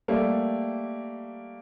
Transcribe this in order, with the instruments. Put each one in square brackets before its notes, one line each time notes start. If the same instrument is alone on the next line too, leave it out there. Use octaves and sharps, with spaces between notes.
[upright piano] G3 A3 A#3